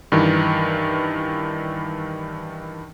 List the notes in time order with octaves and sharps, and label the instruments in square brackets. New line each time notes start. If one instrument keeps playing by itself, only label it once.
[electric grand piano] G2 D#3 E3